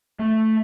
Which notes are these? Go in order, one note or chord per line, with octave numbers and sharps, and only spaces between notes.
A3